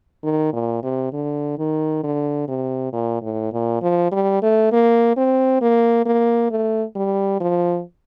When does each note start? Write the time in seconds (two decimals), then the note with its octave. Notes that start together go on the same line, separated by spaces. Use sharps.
0.23 D#3
0.53 A#2
0.83 C3
1.13 D3
1.58 D#3
2.03 D3
2.48 C3
2.93 A#2
3.22 A2
3.53 A#2
3.82 F3
4.12 G3
4.42 A3
4.72 A#3
5.17 C4
5.61 A#3
6.06 A#3
6.51 A3
6.96 G3
7.41 F3